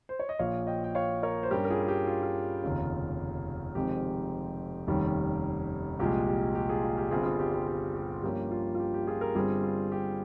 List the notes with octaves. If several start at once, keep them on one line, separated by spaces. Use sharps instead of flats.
C5
C#5
D#5
A#1 A#2 F3 C#5 F5
D#5 G5
G5
C#5 F5
A#4 C#5
C5
G2 G3 C#4 G4 A#4
A#4
F4 G#4
G#4
G4
F4
F4
F1 D#2 C#3
F1 F2 D#3 G#3 C4 G4
F1 D#2 D#3 G3 C#4
C2 A#2 F3 G#3 G4
G4
G4
F4 G#4
F4
G4
G1 G2 G3 C4 F4 G#4
F4 G#4
G4
G4
G4
G4
G2 F3 A#3 C#4 G4
F4
F4
G4
G4
F4 G#4
G4 A#4
G1 G2 G3 C4 F4 G#4
F4
G4